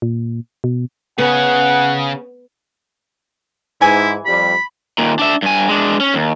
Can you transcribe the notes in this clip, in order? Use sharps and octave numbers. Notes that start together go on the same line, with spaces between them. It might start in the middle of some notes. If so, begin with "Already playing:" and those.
A#2
B2
C#3 B3 G#4 F#5
G#2 E3 E4 G#5
F2 G3 B5
D#2 A#2
D4 E5
G2 G#5
G#3 D4
C#4
D#2